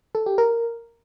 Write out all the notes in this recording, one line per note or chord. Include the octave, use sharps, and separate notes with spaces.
A4
G4
A#4